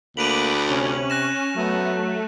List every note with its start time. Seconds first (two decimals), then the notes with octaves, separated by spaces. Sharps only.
0.17 D2 A#3 B5 D6 F#6 D#7 F7 F#7
0.69 C3 C#4
1.10 F#6 A#6 E7
1.56 F#3 A3 B3